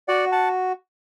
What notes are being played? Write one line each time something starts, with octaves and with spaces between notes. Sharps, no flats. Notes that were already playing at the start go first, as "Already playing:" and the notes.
F#4 D5 F#5
F#5 A5